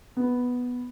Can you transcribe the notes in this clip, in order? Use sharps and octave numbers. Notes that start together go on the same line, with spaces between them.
B3